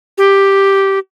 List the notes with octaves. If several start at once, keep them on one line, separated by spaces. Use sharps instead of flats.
G4